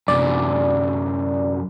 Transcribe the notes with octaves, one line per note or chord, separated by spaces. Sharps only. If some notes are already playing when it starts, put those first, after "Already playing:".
F#2 C3 D5